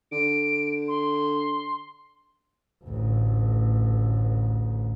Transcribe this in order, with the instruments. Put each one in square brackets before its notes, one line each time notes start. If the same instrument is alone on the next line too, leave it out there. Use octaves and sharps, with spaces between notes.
[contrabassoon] D3 [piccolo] D7
[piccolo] C6
[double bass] A1 D2